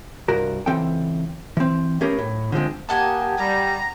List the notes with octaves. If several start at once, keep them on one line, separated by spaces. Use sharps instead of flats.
C2 G2 F#4 A#4
C#2 E3 C4 A4 F#5 G5
E3 C4
A3 B3 C#4 G4 G#4 A#4
A2
D3 F3 G#3 C4
A#3 G4 D#5 F#5 G#5 A5
G3 A#5